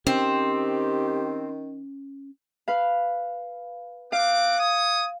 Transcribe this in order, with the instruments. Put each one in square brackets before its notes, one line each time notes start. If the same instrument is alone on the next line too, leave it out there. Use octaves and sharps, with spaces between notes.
[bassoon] D#3 [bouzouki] C4 [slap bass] C#4 [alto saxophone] G4
[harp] B4 F5
[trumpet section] C4 F#5 D6 [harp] F5
[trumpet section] C#5 D#6